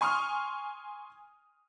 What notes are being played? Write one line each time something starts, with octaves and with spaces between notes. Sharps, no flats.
G#5 C6 C#6 D#6 F6